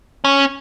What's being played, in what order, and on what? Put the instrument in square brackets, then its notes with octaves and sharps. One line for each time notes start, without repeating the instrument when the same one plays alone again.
[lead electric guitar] C#4